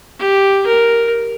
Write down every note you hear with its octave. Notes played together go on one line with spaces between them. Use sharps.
G4
A#4